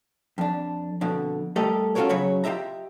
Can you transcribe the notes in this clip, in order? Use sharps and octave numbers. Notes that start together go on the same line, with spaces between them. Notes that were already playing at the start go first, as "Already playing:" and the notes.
F2 D4
F2 B2 D3
G3 A3 G4 A4 A#4 D#5
C#4 F4 F#4 A4 A#4 C#5
C#3 F#3 C#5 B5
F4 G4 D#5 E5 A#5